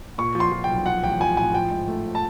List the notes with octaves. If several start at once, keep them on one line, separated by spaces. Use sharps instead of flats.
A#2 C#6
F3
C6
F3
G5
B1
F3 F#5
A1 G5
F3 G#5
A2 G#5
F3 G5
G#2
A3
A5